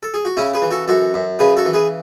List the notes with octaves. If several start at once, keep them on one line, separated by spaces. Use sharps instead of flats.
A4
G#4
F#4
C#3 C#4 E4
G#4 B4
E3
F#4 A4
F#2 F#4 A4
F#2
C#3 G#4 B4
F#4 A4
E3
G#4 B4